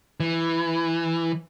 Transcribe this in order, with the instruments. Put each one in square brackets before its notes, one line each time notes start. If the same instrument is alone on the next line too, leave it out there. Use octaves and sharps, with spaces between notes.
[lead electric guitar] E3